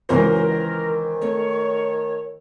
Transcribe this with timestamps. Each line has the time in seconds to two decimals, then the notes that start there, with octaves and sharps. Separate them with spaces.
0.09 C#2 F#2 E3 A#4 C5 C6 C#6
0.50 D#3
1.21 A3 C#5